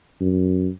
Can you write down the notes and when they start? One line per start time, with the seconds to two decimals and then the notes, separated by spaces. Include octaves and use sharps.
0.21 F#2